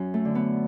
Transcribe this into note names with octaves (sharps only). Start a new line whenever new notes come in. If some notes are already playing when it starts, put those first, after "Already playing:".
Already playing: F#2 F#3 C#4
A3
D3
B3